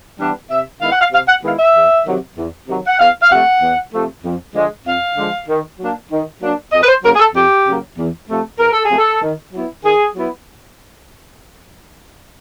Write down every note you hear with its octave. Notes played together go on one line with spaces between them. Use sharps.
E3 G3 B3 D4
C3 E5
D#3 G#3 B3 E4 F5
F#5
F5
C3 F5
F#5
D#3 G#3 B3 E4 F5
E5
E2
C3 D#3 F#3
E2
C3 D#3 F#3
F#5
E2 F5
F5
C3 F3 A3 F#5
E2
C3 F3 A3
F2
D3 F3 G#3
F2 F5
D3 F3 G#3
D#3
F#3 A#3 D4
D#3
F#3 A#3 D4
F2 D#5
B4
C5
C#3 F#3 A#3 A#4
G#4
A4
F2 G4
C#3 F#3 A#3
E2
C3 F3 A3
E2 A#4
A4
G#4
C3 F3 A3
A4
D#3
F#3 B3 E4
D#3 G#4
F#3 B3 E4